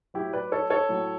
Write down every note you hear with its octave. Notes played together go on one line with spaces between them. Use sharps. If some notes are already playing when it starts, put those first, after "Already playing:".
A2 F#3 E4 G4
B4 D5
A4 C#5
A4 C#5
A2 F#3